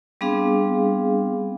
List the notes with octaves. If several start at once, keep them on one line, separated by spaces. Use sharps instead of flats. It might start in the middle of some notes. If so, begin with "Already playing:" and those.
G3 B3 C4 D4 G#4 F5